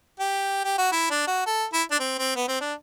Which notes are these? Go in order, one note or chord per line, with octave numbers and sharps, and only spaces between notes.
G4
G4
F#4
E4
D4
F#4
A4
E4
D4
C4
C4
B3
C4
D4